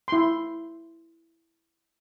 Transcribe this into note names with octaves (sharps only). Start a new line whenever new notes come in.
E4 C6